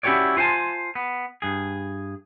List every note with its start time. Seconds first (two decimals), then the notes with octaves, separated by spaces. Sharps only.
0.03 C#4 E4 F#4 G4 C#5 D5
0.37 F4 C5 F#5 G#5 A5
0.95 B3
1.42 G2 G#4